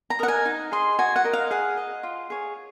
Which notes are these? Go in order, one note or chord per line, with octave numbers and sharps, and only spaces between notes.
A#5
A#4 D#5 F#5
G#5
D#4
G#4 D#5 C6
F#4 G#5
F#5
A#4 D#5
F5
G#4 F#5
D#5
F4
G#4 C#5